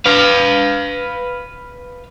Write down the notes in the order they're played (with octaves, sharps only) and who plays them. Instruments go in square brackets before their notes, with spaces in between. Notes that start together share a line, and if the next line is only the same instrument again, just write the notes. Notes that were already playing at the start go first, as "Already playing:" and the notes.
[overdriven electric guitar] B4 F5